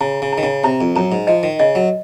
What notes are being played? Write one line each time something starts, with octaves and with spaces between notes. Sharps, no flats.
C#3 A#5
C#3
A#5
D#3
C#3
C3 A#5
F2
F#2 A#5
G#2
F3 D#5
D#3
C#3 D#5
F#3